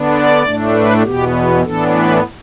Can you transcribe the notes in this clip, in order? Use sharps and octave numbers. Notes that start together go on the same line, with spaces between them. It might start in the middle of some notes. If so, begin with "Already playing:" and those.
Already playing: D3 B3 D4
D5
A2 A3 D4
B4
E2 B2 B3 G4
A2 E3 B3 D4 A4
B4